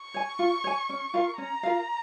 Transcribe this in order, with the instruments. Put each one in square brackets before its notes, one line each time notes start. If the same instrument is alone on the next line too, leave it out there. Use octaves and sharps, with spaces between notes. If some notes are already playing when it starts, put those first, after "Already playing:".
Already playing: [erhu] C#6
[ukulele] C#5 G#5
F4
C#5 G#5
C#4
F4 A#4 F5
[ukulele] C#4 [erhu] A#5
[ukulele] F4 A#4 F5